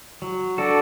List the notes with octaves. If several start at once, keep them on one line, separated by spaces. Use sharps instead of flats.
F#3
D4 F#4 A4